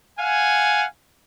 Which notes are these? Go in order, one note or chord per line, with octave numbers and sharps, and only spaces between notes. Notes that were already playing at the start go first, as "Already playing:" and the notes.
F5 F#5 G#5